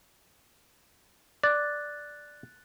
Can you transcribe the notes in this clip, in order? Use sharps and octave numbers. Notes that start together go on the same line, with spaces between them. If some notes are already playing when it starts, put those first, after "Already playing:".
D5 F#6 A6